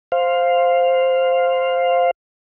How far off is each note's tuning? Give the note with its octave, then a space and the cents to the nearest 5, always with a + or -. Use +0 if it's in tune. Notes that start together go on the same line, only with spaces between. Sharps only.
C5 +0 F5 +0